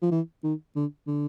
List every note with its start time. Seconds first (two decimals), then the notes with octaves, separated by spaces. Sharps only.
0.02 F3
0.11 E3
0.44 D#3
0.76 D3
1.07 D3